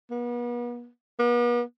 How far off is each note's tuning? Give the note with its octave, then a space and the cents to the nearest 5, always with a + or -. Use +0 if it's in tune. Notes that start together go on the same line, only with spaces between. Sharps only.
B3 -40
B3 -40